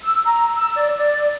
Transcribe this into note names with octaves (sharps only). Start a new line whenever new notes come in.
E6
A#5
E6
D5
D5